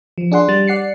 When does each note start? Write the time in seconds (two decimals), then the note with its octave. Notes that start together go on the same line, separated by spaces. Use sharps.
0.18 F3
0.32 D4 G#4 F#5 C6
0.49 G3 A6
0.67 D5 F#5 C7 C#7